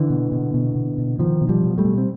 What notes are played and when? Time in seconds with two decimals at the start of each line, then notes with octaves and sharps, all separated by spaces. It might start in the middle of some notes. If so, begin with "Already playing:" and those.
Already playing: D3 E3
0.10 B2
0.32 B2
0.54 B2
0.75 B2
0.98 B2
1.19 B2 D#3 F3
1.41 B2
1.49 F3 G3
1.64 B2
1.78 G3 A3
1.85 B2
1.98 C4